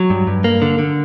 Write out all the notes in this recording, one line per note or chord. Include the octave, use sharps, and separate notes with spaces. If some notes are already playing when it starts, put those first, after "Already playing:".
Already playing: F#3
G2
G2
A#3
D3
D3